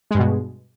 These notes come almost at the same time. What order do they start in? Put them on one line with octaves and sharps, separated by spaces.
G#3 G2 B2